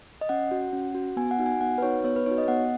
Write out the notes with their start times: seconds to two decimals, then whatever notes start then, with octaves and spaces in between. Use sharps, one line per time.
0.21 D#5
0.29 C#4 F#5
0.51 F#4
0.73 C#4
0.95 F#4
1.17 B3 G#5
1.31 F#5
1.38 D#4 F#4
1.46 G#5
1.61 B3 F#5
1.78 B4
1.82 D#4 F#4 C#5
2.04 B3 C#5
2.16 B4
2.26 D#4 F#4 C#5
2.38 D#5
2.48 B3 F#5